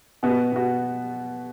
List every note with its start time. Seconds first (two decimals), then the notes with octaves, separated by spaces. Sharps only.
0.23 B2 B3 F#4
0.52 B2 B3 F#4